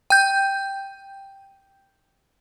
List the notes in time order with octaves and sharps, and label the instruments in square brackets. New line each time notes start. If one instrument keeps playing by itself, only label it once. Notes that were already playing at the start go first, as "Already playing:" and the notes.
[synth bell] G5 G6